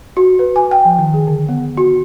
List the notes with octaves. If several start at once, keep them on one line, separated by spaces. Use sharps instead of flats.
F#4
B4
G#5
G5
F3
D#3
G#4
D3
B3
F#4